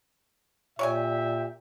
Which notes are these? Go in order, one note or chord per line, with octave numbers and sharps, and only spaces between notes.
A#2 G4 C#5 D5 E5 G#5